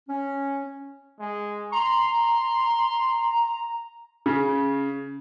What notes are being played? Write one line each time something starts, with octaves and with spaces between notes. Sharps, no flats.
C#4
G#3
A#5 C6
C#3